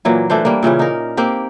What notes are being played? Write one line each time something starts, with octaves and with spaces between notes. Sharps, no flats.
A#2 E3 F#3 A#3
E3 A3 D4 C5
G3 A#3
A#2 C#3 E3 C#4
D#4 A#4
A#3 C4 G4